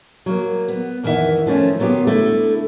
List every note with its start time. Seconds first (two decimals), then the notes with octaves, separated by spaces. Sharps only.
0.26 F#3 A#3
0.68 B3
1.03 F2 D#3 E3 C#4 E5 F#5
1.46 D#3 F3 A3 C#4
1.79 D#3 F#3 B3 F4 G4
2.07 D3 A3 E4 A4